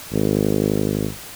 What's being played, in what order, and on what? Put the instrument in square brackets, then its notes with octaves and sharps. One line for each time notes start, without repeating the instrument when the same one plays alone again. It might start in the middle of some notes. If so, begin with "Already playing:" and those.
[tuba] G#1